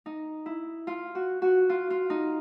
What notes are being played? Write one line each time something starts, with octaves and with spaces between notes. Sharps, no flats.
D#4
E4
F4
F#4
F#4
F4
F4
D#4